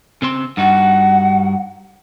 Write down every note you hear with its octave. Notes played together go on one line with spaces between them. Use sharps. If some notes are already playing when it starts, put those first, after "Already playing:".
C#3 C4 C6
G2 D#4 F#4 F#5